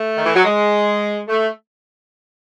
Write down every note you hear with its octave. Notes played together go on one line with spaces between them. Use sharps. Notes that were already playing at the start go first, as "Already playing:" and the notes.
Already playing: A3
D#3
E3
F#3
G#3
A3